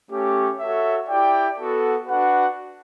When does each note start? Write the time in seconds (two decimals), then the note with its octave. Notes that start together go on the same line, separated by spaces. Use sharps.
0.11 A3 C#4 G4
0.59 F#4 A4 C#5 E5
1.09 E4 G4 D5 G5
1.58 B3 F#4 A4
2.08 D4 F#4 B4 F#5